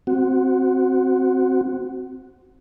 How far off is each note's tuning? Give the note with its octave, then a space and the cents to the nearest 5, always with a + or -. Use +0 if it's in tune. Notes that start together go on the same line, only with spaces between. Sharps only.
C4 +0 F#4 +0